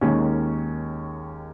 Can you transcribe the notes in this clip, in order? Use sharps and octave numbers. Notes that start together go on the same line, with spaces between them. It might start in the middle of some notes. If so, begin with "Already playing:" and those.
D#2 D#3 G#3 C#4